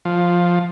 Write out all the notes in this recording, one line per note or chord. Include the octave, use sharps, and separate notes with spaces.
F3